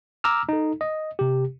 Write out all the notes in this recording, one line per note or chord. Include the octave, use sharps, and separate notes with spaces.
A#5 D6 E6 F6
D#4 A4
D#5
C3 G4